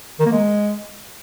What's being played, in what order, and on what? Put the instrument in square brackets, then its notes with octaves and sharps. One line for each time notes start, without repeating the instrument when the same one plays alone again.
[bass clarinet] D#3
A#3
G#3